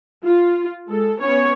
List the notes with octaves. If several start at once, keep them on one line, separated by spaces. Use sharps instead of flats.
F4
G#3 A4
B3 C#4 C#5